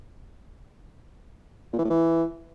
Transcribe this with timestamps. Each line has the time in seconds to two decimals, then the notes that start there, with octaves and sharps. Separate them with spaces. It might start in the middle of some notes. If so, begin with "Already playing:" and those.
1.73 A#2
1.79 E3
1.84 A2
1.90 E3